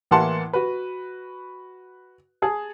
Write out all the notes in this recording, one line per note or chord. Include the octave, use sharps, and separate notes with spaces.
A2 E3 A#3 F#5 A5 C6
F#4 B4
G#4 A5